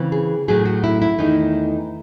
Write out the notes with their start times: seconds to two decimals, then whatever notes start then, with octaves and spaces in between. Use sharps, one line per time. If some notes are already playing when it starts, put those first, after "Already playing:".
Already playing: C#3 E3 C4
0.12 G#4
0.48 A2 F#3 A3 G#4
0.65 F#4
0.84 E4
1.02 E4
1.19 E2 D#3 A3 D#4